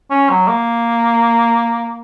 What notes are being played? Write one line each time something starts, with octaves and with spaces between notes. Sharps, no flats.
C#4
F#3
A#3